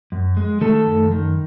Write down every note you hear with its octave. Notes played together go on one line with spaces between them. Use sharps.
F#2
G#3
D#3 A3 A4
F#2
D#3